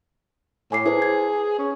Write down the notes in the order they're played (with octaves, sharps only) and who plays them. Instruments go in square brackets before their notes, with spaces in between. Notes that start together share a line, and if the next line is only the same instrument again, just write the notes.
[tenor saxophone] A2 [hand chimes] G#5 D6 C7
[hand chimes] E4 B4 C5 [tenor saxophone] G#4
[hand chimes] G#6
[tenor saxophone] C#4